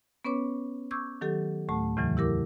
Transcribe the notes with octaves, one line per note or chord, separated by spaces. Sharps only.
B3 C#4 B4 C#5 D6
C#6 D6 E6 G6 G#6
D#3 F#3 G4 A4
D2 A2 A3 A5
E2 A2 C#3 E3 F#3
E4 G4 A#4 D6